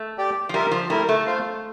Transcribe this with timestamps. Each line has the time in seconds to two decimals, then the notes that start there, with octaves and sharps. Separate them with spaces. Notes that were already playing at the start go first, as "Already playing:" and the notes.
Already playing: A3
0.18 G4 D5 G5
0.49 F3
0.54 G3 F4 A#4 E5
0.71 F3
0.90 G3 A3 E4 A#4
1.09 A3
1.26 F4 C5 F5